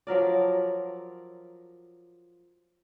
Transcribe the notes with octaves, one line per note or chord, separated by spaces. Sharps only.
F3 F#3 A#4 D5